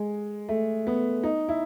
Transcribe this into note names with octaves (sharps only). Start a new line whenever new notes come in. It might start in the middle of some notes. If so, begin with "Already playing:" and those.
Already playing: G#3
A3
B3
D#4
E4